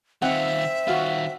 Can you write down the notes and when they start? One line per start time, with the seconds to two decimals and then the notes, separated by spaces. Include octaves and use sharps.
0.22 D#3 C4 F4 E5 F#5
0.87 D#3 F4 F#4 F5